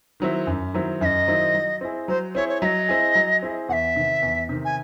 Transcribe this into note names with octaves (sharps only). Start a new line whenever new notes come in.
D#3 F#3 C4 E4
F#2
D#3 F#3 C4 E4
F#2 D#5 E5
D#3 F#3 C4 E4
F#3
C4 E4 G#4
F#3 C5
C4 E4 G#4 C#5
C#5
F#3 D#5 E5
C4 E4 G#4
F#3
C4 E4 G#4
E2 E5 F#5
C3 D#3
E2
C3 D#3
G#5